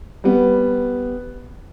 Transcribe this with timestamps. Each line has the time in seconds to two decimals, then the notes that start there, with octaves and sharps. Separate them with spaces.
0.24 G3 B3